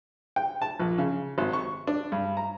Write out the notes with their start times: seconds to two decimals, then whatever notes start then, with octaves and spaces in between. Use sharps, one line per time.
0.36 G5
0.62 A5
0.80 A#1
0.98 C#3
1.38 G#1
1.53 C#6
1.87 D4
2.12 G2
2.37 A#5